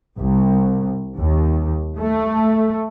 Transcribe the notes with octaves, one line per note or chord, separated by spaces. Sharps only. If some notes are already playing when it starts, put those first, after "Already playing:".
C2
D#2
A3